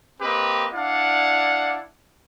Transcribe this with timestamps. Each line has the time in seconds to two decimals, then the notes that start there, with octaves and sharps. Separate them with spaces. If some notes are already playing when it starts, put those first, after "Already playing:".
0.20 A#3 C4 G4 B4 D#5
0.73 D4 E4 D5 F5 F#5